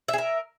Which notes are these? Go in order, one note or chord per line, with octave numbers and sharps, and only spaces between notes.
G#4 A#4 E5